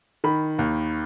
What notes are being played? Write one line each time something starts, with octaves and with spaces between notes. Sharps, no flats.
D#3 B5
D#2